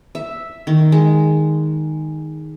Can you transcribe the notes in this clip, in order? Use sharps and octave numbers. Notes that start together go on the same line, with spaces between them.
E5
D#3
G#3